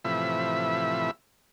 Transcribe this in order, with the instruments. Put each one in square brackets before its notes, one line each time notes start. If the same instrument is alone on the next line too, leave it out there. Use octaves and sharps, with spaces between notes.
[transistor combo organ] A2 C3 E3 F3 E5 B5